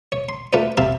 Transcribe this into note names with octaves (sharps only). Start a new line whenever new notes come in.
C#5
C6
A3 F4 B4 C5 D5
C4 G4 E5 F5 A5 B5